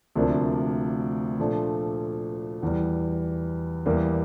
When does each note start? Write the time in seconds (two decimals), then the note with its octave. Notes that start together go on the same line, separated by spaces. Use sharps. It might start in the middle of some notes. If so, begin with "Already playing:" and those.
0.16 D2 C3 F3 A#3 D4
1.39 A#2 F3 A3 D4
2.63 E2 E3 G3
3.86 E2 E3 G3 A#3